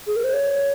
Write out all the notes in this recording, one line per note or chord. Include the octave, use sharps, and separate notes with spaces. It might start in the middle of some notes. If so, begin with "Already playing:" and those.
G#4
A#4
C5
C#5